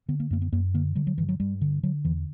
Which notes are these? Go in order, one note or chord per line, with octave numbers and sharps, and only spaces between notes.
D3 B3
A#3
F#2 A#3
B3
F#2 A#3
D3 A#3
D3 G3
F#3
G2 E3
F#3
G2 G3
D3
D3 F#3
E2 E3